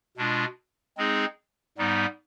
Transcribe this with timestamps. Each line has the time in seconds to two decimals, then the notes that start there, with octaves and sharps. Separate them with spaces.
0.17 B2 G#3 D4 F4
0.98 G#3 C4 D#4 G#4
1.78 G#2 G3 B3 D#4